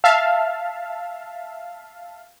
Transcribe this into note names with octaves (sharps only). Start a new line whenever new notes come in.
E5 F5 A5